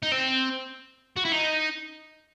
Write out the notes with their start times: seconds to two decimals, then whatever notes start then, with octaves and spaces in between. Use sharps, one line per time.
0.03 D#4
0.12 C4
1.17 F#4
1.25 E4
1.32 D#4